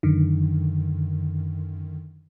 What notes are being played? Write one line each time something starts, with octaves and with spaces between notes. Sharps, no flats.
F#2 D3 D#3